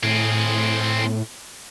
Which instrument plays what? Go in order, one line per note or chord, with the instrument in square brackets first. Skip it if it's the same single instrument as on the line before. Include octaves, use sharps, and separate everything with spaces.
[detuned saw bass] A2 [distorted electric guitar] C4 G#4